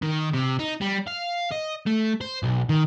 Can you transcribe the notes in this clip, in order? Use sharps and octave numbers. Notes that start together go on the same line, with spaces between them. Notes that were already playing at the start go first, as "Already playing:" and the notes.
D#3
C3
D#4
G3
F5
D#5
A3
C5
B1
D#3